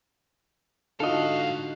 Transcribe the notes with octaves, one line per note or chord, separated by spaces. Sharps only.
G#2 D3 D#4 F4 F#4 A4 D#5 F5